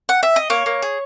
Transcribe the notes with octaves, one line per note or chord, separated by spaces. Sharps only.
F#5
E5
D#5
A#3 C#5
A#3
G#4